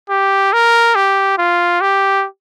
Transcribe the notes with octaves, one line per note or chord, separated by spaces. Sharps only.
G4
A#4
G4
F4
G4